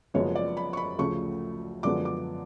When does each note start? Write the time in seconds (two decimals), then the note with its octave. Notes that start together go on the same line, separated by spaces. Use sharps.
0.14 F#1 F#2 F3 G#3 B3 C#5
0.35 D5
0.57 B5
0.73 C#6
0.77 B5
0.98 D2 C#3 F3 A3 C#6
1.83 F#2 D3 F3 G#3 B3 D6
2.05 D6